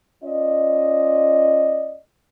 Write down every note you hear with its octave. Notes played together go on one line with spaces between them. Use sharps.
C#4 F4 D5 D#5